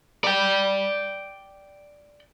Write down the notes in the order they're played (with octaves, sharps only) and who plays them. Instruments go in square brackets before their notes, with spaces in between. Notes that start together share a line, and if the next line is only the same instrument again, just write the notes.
[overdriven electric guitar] D5 G5